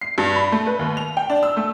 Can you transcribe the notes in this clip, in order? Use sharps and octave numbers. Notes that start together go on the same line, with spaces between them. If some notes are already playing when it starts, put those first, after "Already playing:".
C7
G2
B5
A3
B4
D#2
F7
G5
D4
E6
A3